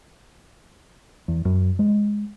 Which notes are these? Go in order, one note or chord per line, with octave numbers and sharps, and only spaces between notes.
E2
F#2
G#3